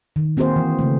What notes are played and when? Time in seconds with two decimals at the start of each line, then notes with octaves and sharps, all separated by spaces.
0.16 D#3
0.37 A#3 C4 F#4 G#4 C5
0.56 E3
0.79 C#3 A3